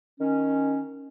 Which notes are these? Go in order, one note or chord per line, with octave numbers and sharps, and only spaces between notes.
D#3 C#4